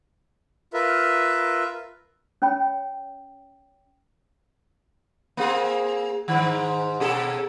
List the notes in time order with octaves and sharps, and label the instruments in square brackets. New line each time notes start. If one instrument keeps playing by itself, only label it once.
[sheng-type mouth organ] F4 A#4 B4 E5
[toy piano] C#4 C#5 G5 B5
[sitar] A#3 C4 G#4
G#2 D#3
B2 G#4 A4